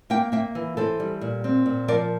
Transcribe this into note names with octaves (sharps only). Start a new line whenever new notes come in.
A#3 E5 G5
A#3 E5 G5
E3
E3 A4 C5
G3
A#2
C4
A#2
F3 A#4 D5